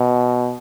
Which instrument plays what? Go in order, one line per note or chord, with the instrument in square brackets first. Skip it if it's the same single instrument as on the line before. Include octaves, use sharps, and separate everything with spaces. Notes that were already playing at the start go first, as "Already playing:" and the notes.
Already playing: [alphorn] B2